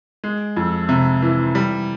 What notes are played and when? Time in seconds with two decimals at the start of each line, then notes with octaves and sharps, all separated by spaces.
0.24 G#3
0.57 F2
0.89 C3
1.22 E3
1.55 G3